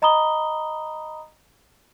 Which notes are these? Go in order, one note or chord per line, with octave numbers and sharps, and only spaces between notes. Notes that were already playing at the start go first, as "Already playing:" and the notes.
D#5 A#5 B5 D#6 G7